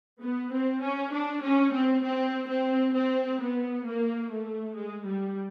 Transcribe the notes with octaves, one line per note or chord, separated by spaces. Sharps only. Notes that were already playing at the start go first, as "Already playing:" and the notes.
B3
C4
C#4
D4
C#4
C4
C4
C4
C4
B3
A#3
A3
G#3
G3